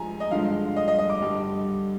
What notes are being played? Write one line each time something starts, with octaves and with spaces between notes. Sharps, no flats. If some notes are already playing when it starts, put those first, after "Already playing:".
Already playing: G2 F3 G#3 G#5 A#5
D#5
G2 D3 F3 G#3 F5
D#5
D#5
D#5
D6
G2 D3 G3